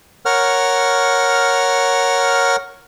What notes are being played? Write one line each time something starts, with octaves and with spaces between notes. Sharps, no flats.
A#4 C#5 F#5 F6